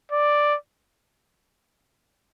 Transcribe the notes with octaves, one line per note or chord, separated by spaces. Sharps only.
D5